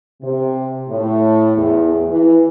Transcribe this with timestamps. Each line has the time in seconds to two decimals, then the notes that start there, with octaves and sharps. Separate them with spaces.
0.22 C3
0.90 A2
1.56 E2
2.09 E3